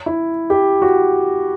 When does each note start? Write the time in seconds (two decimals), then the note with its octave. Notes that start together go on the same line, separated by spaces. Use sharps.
0.06 E4
0.50 G4
0.82 F#4